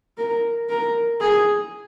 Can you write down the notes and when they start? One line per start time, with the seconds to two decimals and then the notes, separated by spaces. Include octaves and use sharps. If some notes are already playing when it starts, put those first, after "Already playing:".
0.18 A#4
0.69 A#4
1.21 G#4